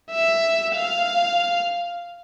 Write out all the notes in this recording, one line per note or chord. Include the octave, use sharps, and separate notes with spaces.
E5
F5